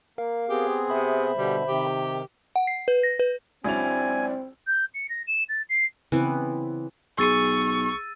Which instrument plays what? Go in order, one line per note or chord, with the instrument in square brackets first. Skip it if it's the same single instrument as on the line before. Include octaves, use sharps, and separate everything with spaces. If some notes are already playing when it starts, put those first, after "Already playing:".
[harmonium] A#3 [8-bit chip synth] A#4 F5
[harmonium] B3 C4 G#4 [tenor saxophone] G4
[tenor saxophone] C3 [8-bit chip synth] C5 E5 B5
[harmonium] B2 D3 [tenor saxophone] G3
[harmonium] C3 D#3 [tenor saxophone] G4
[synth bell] F#5
C7
B4
A#6
B4
[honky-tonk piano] C#2 F#3 F7 [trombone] C4 [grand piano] D4 E4 D5 [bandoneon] G#5
[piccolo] G6
C#7
A#6
E7
A6
C7
[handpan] C#3 C4 [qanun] E3 B3
[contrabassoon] B1 [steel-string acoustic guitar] G#4 [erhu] C#6 [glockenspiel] E6 A6 D#7